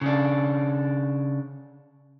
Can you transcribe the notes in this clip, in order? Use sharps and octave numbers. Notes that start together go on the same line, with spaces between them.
C#3 D4